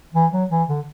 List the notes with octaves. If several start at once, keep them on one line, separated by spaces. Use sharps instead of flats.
E3
F#3
E3
D3